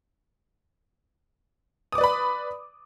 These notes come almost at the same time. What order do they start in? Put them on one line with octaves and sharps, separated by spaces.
D#6 D6 D5 B4 B5